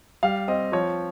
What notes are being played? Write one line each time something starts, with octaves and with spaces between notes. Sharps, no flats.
G3 F5
C4 D#5
F3 C#5